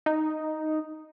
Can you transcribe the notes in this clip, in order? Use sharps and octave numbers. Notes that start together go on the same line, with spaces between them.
D#4